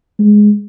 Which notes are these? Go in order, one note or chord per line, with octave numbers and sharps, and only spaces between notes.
G#3